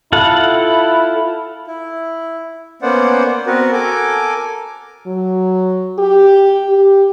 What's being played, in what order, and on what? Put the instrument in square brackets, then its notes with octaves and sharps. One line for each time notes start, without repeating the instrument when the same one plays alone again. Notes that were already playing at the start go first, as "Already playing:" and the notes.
[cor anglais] E4 [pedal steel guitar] F4 A4 F#5
[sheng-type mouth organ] E4
A#3 B3 C#4 C5 D5 F#5
B3 C4 F#4 A#4 B4
A4 A#4 G#5 D6
[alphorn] F#3
G4
G4